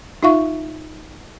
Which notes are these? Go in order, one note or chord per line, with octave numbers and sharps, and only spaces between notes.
D#4 F4 E5 F5 C#6